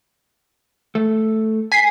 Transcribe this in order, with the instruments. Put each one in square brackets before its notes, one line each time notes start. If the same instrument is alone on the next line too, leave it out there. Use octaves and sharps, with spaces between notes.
[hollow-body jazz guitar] A3
[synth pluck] G#5 B6 C7